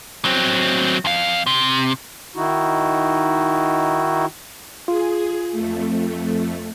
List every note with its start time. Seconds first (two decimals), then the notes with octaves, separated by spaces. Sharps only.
0.25 F#3 C4
1.05 F2 F5
1.46 C3
2.35 D#3 D#4 E4 F#4
4.88 F4 G#4
5.52 F2 A3